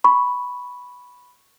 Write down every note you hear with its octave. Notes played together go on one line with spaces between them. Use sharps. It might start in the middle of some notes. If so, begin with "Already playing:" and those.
B5 C#6